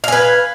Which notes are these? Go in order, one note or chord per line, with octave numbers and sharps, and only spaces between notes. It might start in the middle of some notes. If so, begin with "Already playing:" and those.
B4 F5 G#5